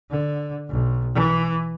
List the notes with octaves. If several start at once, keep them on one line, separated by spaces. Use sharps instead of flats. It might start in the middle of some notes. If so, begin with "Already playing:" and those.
D3
B1
E3